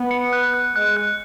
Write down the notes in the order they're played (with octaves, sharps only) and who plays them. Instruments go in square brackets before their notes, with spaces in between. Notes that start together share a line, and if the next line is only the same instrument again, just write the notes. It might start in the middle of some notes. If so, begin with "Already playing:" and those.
Already playing: [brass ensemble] B3
[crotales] C#7
F#6
F#6
[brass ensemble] G#3 [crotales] F#6
[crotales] F#6